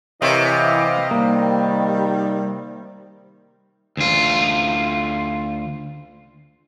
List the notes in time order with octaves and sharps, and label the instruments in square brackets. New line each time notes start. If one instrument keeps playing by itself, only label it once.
[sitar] C3 [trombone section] E3 [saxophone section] C4 D#5 F5 [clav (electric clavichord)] E4 A#4 C#5
[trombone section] D#3 [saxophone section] G3 [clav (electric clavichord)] A#3
[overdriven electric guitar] D2 F4